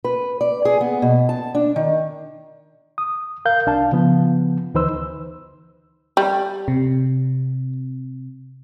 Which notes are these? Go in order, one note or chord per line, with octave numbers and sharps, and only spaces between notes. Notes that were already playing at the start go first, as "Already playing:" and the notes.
B4
D5
G#4
B3
B2
A5
D4
D#3
D#6
A#4 F5 G6
C2 D4 F5 A5
C#3 F3 B3
D2 E3 D#4 B4 C5 E6
G3
C3